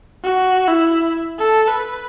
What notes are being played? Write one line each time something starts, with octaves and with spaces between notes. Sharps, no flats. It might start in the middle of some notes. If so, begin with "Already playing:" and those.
F#4
E4
A4
B4